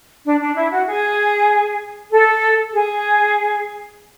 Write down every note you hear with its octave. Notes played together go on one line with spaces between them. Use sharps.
D4
D4
E4
F#4
G#4
A4
G#4